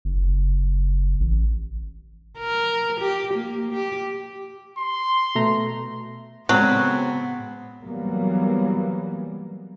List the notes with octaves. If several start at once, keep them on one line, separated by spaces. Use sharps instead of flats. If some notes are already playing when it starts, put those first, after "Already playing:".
F#1
A1
A#4
G4
A#3
G4
C6
B2 A3 A#5
A2 C#3 F#3 G#3 B3 C4
E3 F#3 G3 A#3 B3